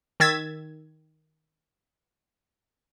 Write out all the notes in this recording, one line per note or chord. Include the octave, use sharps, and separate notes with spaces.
D#3 E6 G#6 A6 B6